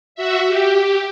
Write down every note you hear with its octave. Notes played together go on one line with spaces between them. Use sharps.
F#4 E5
G4